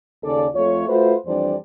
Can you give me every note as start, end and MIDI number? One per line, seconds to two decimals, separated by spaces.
0.23 0.47 39
0.23 0.47 49
0.23 0.47 69
0.23 0.47 74
0.55 0.86 41
0.55 0.86 57
0.55 0.86 65
0.55 0.86 73
0.88 1.14 57
0.88 1.14 65
0.88 1.14 66
0.88 1.14 71
0.88 1.14 72
1.26 1.54 41
1.26 1.54 52
1.26 1.54 55
1.26 1.54 62
1.26 1.54 72
1.26 1.54 74